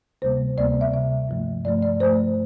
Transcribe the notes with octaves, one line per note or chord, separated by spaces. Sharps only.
D2 C3 G3 A#3 C5
D2 C3 G3 A#3 D5
E5
D2 C3 G3 A#3 E5
G2 F3 A3
G2 F3 A3 D5
D5
G2 F3 A3 C5